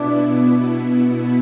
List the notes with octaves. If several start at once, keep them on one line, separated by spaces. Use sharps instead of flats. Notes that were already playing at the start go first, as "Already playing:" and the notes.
Already playing: B2 B3 D4 E4